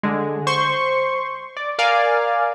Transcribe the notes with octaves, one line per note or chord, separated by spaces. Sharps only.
D3 G#3
C5 C6 C#6
D5
A#4 D5 F5 G#5